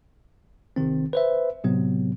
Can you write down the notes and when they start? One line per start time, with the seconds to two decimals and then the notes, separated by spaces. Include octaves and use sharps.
0.76 A1 C3 D#3 C4
1.13 B4 C5 E5
1.64 A2 C3 F#3 B3